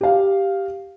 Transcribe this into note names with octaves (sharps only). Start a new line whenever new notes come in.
G4 F5